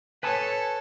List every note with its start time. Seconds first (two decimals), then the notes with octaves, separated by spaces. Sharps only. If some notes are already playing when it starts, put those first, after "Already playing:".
0.23 A4 B4 C#5 G#5 A5